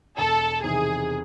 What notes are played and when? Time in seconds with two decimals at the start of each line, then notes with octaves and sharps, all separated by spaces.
0.17 E1 A4
0.63 E2 C3 D#3 G#4